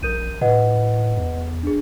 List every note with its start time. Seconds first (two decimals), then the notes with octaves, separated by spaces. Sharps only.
0.03 A#1 A#4 G6 D#7
0.41 A2 B4 D#5 F#5
1.17 E2
1.63 D4 G#4